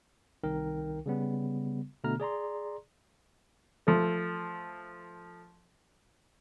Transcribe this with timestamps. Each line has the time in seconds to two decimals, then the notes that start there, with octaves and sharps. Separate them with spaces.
0.43 C2 D#3 D#4 A#4 G5
1.06 C#3 G3 B3
2.04 B2 D3 A3 B3 A#5 F6
2.20 G#4 D5 A#5 C6
3.87 F3 A3